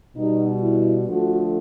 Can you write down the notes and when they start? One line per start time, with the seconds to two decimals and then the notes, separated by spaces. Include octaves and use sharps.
0.16 B2 G3 D#4
0.62 E4
1.05 D3 F3 A3 F#4